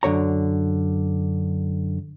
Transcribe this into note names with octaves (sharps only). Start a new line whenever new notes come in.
F#2 D3 C#5 A#5